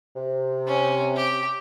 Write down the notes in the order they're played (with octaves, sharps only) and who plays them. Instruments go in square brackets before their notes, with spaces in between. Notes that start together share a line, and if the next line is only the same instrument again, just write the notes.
[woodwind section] C3
[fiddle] C#4
G4